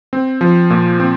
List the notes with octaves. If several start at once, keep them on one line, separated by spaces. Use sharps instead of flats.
C4
F3
A#2
C4